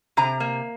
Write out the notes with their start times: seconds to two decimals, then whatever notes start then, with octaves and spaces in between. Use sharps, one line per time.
0.17 C3 A#5
0.40 A#3